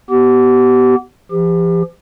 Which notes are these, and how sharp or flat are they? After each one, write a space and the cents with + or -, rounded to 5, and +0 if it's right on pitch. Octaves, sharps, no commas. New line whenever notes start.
B3 +0 G4 -30
F3 -45 G4 +30